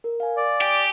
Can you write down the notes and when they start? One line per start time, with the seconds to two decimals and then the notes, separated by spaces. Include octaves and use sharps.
0.04 A#4
0.20 F5 G#5
0.37 D5
0.61 G4 G5 G#5 D#6